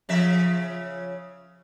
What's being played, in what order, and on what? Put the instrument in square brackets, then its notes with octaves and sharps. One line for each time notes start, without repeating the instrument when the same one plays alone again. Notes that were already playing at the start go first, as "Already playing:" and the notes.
[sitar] C#3 F3 E5